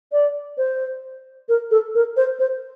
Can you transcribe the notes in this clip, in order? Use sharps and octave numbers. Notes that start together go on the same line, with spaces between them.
D5
C5
A#4
A4
A#4
C5
C5